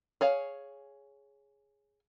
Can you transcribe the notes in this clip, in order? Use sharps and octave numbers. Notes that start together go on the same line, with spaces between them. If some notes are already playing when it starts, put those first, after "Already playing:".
G#4 C#5 F5